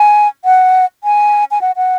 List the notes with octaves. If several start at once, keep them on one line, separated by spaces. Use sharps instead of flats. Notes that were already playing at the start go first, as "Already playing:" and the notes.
Already playing: G#5
F#5
G#5
G#5
F#5
F#5